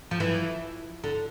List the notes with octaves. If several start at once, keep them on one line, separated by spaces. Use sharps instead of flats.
F3
E3
D3